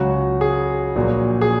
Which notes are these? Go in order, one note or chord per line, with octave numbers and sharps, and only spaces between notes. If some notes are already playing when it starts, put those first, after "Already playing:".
Already playing: C#2 C#3 F#3 F#4
G#4
A#1 A#2 F#3
G#4